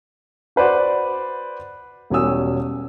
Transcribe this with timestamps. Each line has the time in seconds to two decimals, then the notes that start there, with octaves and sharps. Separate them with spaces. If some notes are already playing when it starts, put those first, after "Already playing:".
0.56 F#4 B4 C5 D5 F#5
2.10 E1 G3 C#4 F#4 D#6 E6